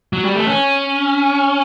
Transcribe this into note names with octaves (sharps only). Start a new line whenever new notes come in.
F#3
G3
A3
C#4